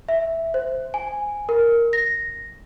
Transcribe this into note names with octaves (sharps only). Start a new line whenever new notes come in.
E5
C5
G#5
A#4
A#6